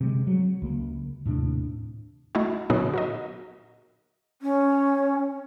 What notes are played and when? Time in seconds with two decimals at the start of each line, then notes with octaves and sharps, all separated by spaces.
0.01 C3 G3 G#3
0.27 F#3
0.62 C#2 A#3
1.25 D#2 A2 C3 D4
2.35 A3 D#4 E4 F#4
2.70 A#2 D3 F#3 B3 D#4 G#4
2.94 F#4 A#4 D#5
4.42 C#4